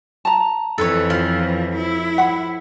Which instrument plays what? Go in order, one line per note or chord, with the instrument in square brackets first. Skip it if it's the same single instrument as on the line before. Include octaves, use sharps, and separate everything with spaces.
[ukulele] A5 A#5
[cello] F2 E3 [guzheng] A4 B4 C#5
[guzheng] F3
[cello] E4
[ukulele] F#5 B5